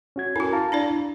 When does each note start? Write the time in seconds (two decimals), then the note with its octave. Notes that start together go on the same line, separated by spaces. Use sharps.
0.16 C#4 F#4 G#6
0.36 E4 F#4 A4 A#4 G#5
0.53 F5 A5 A#5
0.72 D4 E4 D5